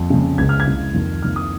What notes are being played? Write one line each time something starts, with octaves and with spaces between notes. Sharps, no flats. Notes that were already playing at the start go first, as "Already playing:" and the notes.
Already playing: F2
F2 C#3
C#2 C#3 G#6
F6
G#6
C#2 C#3
F2 D#3
F2 D#3 F6
D#6